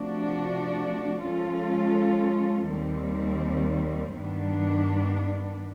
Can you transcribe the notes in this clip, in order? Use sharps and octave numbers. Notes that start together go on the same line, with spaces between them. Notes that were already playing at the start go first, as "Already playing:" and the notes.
Already playing: C3 F3 A3 D4 F#4
F3 G#3 C#4 F4 A4
D#2 D#3 G3 C4
G2 D#3 G3 B3 D4